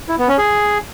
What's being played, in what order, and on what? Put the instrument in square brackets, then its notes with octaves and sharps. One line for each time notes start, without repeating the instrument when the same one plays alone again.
[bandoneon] E4
B3
C#4
G#4